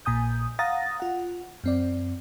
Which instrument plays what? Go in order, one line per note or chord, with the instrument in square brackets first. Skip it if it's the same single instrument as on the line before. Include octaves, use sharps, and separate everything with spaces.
[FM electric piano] A#1 A#2 G#5 D#6 G6
F5 F#5 A#5 D#6 A6 A#6
F4 F#5
F#2 C4 D5